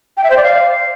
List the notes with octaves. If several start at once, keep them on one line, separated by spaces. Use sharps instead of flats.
G5
E5
C5
D5
F5